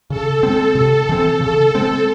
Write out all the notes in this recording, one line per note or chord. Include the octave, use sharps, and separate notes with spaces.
C#3 A4
G#3 C4 A4
C3 A4
E3 C4
C#3 A4
G#3 C4